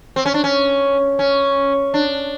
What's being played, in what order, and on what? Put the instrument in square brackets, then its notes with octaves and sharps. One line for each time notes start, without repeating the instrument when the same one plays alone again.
[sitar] C4
C#4
D4
C#4
C#4
D4